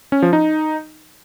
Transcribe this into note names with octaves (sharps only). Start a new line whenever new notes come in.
C#4
F3
D#4